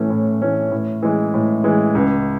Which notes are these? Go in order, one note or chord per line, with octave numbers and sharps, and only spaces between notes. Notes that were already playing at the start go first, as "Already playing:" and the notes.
Already playing: A2 E3 A3 C#4
A2
E3 A3 C#4
A2
E3 G#3
A2
E3 G#3
C#2